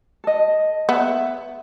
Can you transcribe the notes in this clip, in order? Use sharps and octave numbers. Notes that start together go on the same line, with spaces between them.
A4 D#5
B3 E5